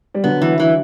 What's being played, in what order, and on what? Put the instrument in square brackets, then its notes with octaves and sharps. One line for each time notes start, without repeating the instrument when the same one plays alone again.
[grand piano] G3
[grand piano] D3 F#3 [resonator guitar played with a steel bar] B3
[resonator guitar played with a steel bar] E3
E3